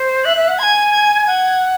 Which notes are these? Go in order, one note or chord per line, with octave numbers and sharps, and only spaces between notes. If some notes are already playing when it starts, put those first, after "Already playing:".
Already playing: C5
E5 F#6
E5
F#5
G#5 C6 G#6
G#6
F#5 G#6